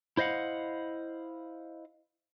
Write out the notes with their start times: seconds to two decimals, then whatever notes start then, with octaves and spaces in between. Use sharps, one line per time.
0.17 E4 C5 D#5 F5 F#5